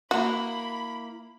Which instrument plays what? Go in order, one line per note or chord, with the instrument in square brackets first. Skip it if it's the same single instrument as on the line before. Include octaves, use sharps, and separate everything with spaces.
[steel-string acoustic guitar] A#3 E4 A#4 [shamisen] F#4 [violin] B5